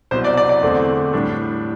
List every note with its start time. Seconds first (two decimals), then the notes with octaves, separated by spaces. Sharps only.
0.11 C2 B2 F#3 C5
0.25 D5
0.37 D5
0.49 D5
0.62 E2 D3 A3 C4
1.13 A2 G3 D4